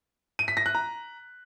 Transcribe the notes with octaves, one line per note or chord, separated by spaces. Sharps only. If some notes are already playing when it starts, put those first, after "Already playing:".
D#7
B6
A#6
F#6
A#5